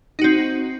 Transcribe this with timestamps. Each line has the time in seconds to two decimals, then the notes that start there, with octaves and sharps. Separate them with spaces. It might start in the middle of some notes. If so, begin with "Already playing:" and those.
0.19 D#4
0.21 F#4
0.24 C4